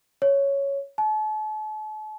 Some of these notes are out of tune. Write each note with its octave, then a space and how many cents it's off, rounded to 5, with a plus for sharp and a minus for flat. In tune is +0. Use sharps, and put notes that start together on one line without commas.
C#5 +0
A5 -40